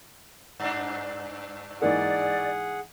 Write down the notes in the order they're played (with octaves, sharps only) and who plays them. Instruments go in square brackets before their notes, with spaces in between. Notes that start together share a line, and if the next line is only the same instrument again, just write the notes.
[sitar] G2 D4
[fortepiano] G#2 E3 A#3 [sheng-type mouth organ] G#4 F#5 [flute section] D5